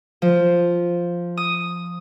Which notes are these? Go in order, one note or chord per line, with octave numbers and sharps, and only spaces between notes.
F3
D#6